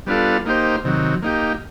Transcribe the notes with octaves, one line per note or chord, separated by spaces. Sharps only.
G3 B3 D4 F4 A4
A#3 D#4 G4 C5
C3 D#3 F#3
A#3 D#4 G4